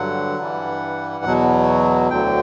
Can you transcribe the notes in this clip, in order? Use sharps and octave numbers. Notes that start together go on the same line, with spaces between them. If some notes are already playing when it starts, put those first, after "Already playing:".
Already playing: G2 D3 F#3 F#5
G2 E3 G3
E2 B2 F#3
D2 D3 F#3 G5